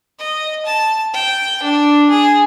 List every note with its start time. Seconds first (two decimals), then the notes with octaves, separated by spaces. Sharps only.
0.19 D#5
0.66 A5
1.14 G5
1.63 D4
2.10 G#4